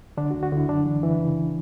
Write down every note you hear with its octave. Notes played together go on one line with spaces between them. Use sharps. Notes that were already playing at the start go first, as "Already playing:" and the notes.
D3 D4
F#4
D2
F#4
D3 E4
F#2 D4
E3
E3
C#3